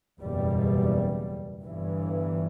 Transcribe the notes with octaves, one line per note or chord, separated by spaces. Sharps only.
F#1 E2 B2 G3
G1 G2 E3